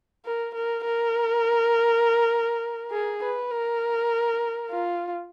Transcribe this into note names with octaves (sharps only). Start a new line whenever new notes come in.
A#4
A#4
A#4
G#4
B4
A#4
F4